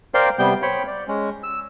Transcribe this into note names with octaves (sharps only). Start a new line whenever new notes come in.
A#4 C5 D5 F5 G5 C6
C3 G3 B3 G5 G6
C5 C#5 G5 B5
D5
G#3 C#4
E6